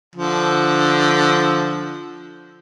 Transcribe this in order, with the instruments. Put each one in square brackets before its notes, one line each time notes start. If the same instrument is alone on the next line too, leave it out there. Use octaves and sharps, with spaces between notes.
[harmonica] D3 F3